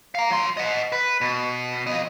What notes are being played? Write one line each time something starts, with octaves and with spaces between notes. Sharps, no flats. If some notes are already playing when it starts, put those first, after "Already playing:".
F5 A#5
F#3 C6
D#5 F#5
B4
B2
F2 D#5